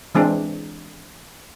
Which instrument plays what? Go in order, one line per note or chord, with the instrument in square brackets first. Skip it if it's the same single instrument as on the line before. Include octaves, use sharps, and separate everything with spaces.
[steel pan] E3 G#3 C4 D4